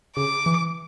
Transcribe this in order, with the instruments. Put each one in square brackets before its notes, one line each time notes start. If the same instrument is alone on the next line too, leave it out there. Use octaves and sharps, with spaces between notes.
[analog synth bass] C#3 [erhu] D6
[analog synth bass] E3